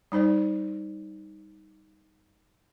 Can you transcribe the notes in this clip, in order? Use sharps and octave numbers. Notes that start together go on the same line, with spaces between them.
G3 D#4 C5 D5